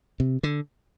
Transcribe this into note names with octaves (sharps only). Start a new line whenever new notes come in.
C3
D3